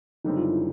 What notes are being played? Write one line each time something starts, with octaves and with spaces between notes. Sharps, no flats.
F#1 F#2 D3 G3 C4 D#4
F4
E4